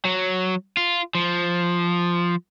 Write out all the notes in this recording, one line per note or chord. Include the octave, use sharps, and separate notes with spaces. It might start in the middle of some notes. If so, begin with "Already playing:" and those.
F#3
F4
F3